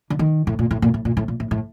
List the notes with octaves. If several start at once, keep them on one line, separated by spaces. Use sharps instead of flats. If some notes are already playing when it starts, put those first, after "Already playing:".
D3
D#3
A2
A#2
A2
A#2
A2
A#2
A2
A#2
A2
A2